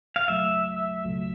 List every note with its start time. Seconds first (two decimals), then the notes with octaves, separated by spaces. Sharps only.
0.16 F5
0.28 C#2 B2 F#3 A3 E5
1.04 C#2 B2 F#3 A3